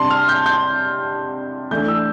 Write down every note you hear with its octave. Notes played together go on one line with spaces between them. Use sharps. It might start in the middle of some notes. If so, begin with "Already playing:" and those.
Already playing: C3 G3 D4 A5 C6
F6
G6
G6
E3 A3 D4 G6
E6